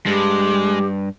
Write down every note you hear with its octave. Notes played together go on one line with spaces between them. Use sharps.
G2 G#3 G4